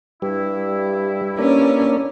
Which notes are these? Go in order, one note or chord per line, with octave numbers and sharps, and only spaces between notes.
G2 G3 E4
A#3 C#4 D4